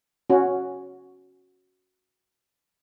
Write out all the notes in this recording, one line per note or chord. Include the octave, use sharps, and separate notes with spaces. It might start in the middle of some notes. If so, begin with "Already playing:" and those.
C#4 F#4